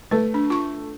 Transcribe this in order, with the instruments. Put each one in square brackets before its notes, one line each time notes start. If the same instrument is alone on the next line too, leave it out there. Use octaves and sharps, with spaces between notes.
[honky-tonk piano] A3 [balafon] B4
[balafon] D4
F4 C#6